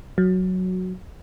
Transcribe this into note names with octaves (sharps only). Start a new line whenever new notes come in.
F#3